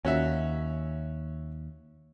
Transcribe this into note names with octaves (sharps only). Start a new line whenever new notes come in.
D#2 C#4 F#4 E5